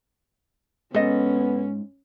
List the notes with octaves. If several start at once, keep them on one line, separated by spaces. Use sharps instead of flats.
G#2 B3 C#4 A4 D#5